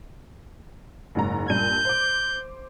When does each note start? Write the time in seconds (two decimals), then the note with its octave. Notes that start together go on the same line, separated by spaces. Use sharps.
1.15 F#1 G#2 A#5
1.50 G2 A#2 G6 D#7
1.85 C5 D6